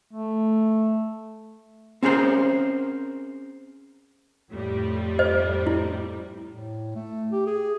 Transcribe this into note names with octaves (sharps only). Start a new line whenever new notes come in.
A3
C4 C#4 G#4 A#4 C5
F2 A2 G3
C5 D#5
E4
A2
A3
G4
G#4